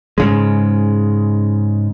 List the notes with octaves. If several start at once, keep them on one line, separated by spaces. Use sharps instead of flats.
G#2 C#3 G#3